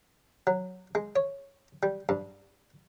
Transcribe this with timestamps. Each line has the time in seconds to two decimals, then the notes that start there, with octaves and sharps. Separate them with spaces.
0.47 F#3
0.95 G#3
1.16 C#5
1.83 G3
2.09 G2